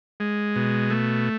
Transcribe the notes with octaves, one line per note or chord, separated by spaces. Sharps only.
G#3
B2
A3